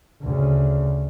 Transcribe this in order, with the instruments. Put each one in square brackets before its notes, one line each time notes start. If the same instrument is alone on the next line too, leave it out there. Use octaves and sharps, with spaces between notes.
[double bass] D2 C#3